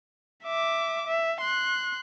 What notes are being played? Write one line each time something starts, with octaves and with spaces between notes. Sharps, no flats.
E5 D6
E5
C6 F#6